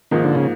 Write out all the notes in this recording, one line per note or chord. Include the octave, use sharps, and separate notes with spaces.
G#2 D#3 F3 A#3
D3
C#3